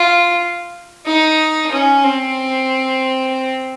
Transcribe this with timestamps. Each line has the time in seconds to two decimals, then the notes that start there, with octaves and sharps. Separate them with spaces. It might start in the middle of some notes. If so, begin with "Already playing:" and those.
Already playing: F4
1.06 D#4
1.72 C#4
2.04 C4